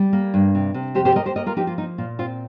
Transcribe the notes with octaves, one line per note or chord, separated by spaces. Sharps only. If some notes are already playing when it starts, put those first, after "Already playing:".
Already playing: G3
A#3
G2
C3
C3
F2 G4 C5
G4 C5
A#3 A#4 D#5
G4 C5
A#3 A#4 D#5
F4 A#4
F3 D#4 G4
F4
A#3 D#4
A#2 F4
C4 F4